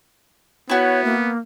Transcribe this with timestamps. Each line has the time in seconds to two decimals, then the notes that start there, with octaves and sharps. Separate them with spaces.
0.69 B3 E4 F#4 C#5
1.04 A#3